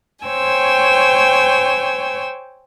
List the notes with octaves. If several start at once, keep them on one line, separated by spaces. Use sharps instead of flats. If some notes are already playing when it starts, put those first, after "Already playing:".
C5 C#5 G5 G#5 E6